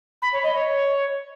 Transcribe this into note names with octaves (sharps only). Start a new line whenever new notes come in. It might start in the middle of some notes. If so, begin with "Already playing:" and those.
B5
C#5
D#5
C#5